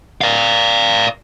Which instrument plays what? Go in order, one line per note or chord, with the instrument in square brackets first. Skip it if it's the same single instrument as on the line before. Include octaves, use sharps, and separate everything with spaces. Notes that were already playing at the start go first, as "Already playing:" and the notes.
[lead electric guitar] D5 F5